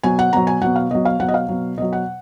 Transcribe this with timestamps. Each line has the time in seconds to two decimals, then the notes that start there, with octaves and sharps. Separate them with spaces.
0.03 B2 F#3 G#5
0.19 F#5
0.33 B2 F#3 A#5
0.47 G#5
0.62 B2 F#3 F#5
0.76 F5
0.91 B2 F#3 D#5
1.05 F5
1.20 B2 F#3 F#5
1.29 D#5
1.34 F5
1.49 B2 F#3
1.78 B2 F#3 D#5
1.93 F#5